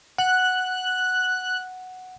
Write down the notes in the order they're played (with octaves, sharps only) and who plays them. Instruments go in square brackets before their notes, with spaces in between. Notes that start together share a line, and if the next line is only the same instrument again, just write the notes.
[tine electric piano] F#5 [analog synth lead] F#6